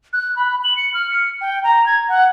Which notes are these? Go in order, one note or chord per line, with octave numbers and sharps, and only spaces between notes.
F#6
B5
F#7
C#7
F6
C#7
G5
A#5
G#6
F#5